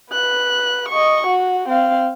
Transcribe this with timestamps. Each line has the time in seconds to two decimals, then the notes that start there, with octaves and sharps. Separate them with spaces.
0.12 B4 F#6
0.88 D#5 C#6
1.27 F#4
1.69 C4 F5